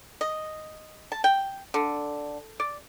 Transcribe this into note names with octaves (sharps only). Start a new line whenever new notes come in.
D#5
A5
G5
D3
D5